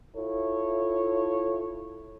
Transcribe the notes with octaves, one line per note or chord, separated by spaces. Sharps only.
E4 F4 A4 C#5